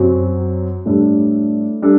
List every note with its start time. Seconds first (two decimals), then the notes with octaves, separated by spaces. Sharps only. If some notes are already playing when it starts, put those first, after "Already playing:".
Already playing: F#2 F#3 C4
0.86 A2 G3 D4 A4
1.82 G3 D4 A4